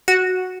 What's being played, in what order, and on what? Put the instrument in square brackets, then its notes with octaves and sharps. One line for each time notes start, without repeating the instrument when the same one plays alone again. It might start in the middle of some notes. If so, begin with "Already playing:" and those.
[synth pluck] F#4